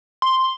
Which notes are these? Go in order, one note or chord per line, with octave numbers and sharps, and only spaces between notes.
C6